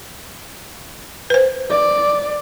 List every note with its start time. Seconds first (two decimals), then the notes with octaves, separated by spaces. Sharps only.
1.30 B4 C5
1.70 D5